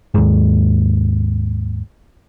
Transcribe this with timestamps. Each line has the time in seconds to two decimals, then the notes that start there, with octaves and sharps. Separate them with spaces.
0.14 D#2 G#2